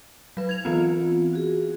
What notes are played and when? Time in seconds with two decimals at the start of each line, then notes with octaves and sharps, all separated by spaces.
0.37 F#3 B4
0.49 G#6 F7
0.65 E3 B3 C4 F4
1.33 F#4 G#4